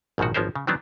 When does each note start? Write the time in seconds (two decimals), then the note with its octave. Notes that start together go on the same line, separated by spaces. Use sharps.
0.18 A#1 G#2 B2 D#3 F#4
0.34 G#1 F3 B3 C#4 A#4 C5
0.55 C#3
0.67 D#3 E3 F#3 B3 C4 D4